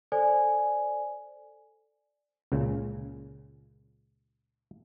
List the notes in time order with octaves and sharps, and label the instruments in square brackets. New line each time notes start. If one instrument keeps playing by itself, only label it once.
[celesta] A4 C5 D5 G#5
[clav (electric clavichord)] C#2 A#2 C#3